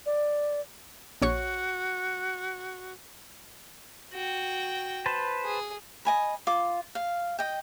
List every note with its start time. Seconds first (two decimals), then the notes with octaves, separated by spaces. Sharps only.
0.06 D5
1.22 A#1 F#4 C#5 C#6
4.13 F#4 G5
5.06 B4 C5 A5
5.44 G#4
6.05 D#5 G#5 B5
6.47 F4 D6
6.95 F5
7.39 D#5 G5